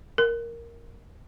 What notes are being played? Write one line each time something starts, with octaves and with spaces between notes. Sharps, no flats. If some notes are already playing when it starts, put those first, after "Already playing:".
A#4